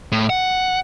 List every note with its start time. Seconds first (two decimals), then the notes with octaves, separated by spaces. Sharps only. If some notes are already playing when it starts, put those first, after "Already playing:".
0.12 A2
0.30 F#5